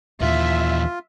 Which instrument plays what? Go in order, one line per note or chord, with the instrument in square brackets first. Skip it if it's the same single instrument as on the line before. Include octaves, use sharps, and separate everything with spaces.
[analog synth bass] D#2 [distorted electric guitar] A#2 E3 [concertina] F4 [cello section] E5